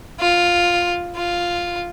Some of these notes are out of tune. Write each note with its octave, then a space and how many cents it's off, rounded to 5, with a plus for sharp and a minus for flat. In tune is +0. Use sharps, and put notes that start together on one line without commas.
F4 +5
F4 +0